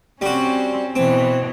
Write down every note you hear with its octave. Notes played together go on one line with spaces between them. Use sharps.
G3 C4 C#4 F#4
B2 E3 C4